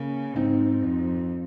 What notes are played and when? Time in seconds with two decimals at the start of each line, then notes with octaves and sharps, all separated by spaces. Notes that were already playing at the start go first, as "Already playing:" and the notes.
Already playing: C#3 A#3 C#4
0.36 G#2 C4 D#4
0.82 F2